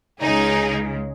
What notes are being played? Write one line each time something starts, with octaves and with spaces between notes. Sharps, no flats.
C#2 C#3 G#3 D#4 G#4